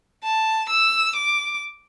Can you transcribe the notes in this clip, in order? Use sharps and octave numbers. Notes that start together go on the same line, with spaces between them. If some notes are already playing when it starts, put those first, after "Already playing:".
A5
E6
D6